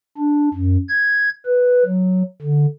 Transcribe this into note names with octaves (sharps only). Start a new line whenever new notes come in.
D4
F#2
G#6
B4
F#3
D3